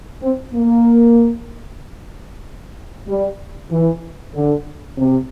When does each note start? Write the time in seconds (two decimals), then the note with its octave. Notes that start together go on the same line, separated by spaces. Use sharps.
0.22 C4
0.54 A#3
3.07 G3
3.70 E3
4.34 D3
4.98 C3